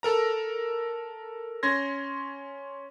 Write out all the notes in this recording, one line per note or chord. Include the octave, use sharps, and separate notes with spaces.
A4 A#4 A#5
C#4 C6 G#6 A#6